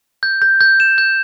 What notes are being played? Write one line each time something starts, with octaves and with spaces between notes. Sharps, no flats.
G6
G6
G6
E7
G6